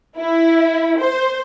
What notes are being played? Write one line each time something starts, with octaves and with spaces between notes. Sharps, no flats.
E4
C5